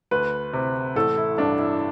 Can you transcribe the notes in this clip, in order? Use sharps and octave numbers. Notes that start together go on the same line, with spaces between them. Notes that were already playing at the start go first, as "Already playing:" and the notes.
D2 B4
C3
A1 A4
E4
G2 D4
E4